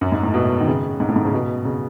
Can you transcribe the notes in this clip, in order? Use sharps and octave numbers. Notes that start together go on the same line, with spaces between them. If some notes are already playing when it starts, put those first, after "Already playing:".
F#2
G#2
A2
B2
D#3
C#3
G#2
A2
G#2
C#3
B2
C#3